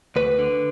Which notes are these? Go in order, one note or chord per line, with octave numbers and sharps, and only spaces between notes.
D2 B4
D3